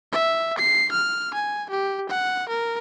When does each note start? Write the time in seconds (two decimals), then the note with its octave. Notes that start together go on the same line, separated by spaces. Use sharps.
0.12 E5
0.58 C7
0.92 F6
1.34 G#5
1.70 G4
2.09 F#5
2.49 A#4